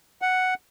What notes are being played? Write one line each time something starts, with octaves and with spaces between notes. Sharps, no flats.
F#5